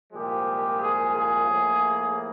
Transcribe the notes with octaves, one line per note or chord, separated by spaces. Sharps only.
C2 A#2 F3 G#3 G4
G#4
G#4
A2 F3 A#3